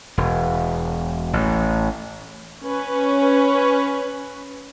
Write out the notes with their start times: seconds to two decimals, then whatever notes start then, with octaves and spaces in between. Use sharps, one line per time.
0.18 E1
1.33 A1
2.62 C#4 B4